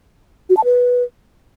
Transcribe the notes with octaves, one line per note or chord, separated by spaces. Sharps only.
F#4
A5
B4